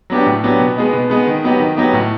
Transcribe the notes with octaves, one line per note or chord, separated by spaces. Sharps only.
F#3 B3 D4 G4
A2
F#3 B3 D4 G4
B2
G#3 B3 D#4
B2
G#3 B3 D#4
D#3
F#3 B3 D#4 G4
D#3
F#3 B3 D#4 G4
A2